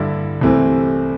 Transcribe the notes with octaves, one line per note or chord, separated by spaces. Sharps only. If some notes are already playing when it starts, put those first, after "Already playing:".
Already playing: G2 D3 G3 E4
C2 C3 E3 A3 C4